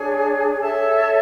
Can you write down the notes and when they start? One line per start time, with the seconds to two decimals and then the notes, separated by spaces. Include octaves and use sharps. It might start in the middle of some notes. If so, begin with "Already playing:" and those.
Already playing: D4 G#4 C#5 G#5
0.59 A4 C#5 E5 A5